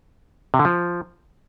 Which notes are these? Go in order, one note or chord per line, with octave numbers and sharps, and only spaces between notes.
C3
D3
F3